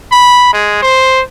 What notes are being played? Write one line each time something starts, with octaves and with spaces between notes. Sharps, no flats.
B5
G#3
C5